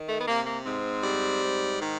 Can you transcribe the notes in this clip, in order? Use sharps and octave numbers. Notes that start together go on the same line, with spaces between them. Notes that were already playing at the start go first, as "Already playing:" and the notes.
Already playing: D#3
A3
B3
C3 A#3
A#3
G#2 C4
G3
G#2
D#3